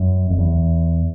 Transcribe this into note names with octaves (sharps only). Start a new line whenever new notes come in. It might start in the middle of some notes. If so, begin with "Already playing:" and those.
Already playing: F#2
F2
E2